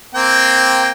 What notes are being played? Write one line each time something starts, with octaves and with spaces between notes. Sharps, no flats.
A#3 C4 G5